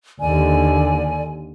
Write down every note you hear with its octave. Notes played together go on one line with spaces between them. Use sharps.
D#2 D3 D5 G#5